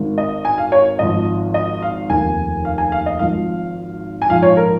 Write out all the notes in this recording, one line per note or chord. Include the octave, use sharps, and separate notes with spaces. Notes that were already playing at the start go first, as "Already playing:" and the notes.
Already playing: G#1 G#2 D#3
D#5
G#5
F5
C#5
G#1 G#2 F3 D#5
D#5
F5
F1 D#2 D#3 G#5
F5
G#5
F5
D#5
G#1 G#2 F3 F5
G#5
A#1 G#2 F3 F5
C#5
A#4